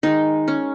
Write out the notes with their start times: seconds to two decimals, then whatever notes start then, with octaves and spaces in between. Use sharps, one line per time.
0.03 D#3 G#3 D#4
0.48 C#4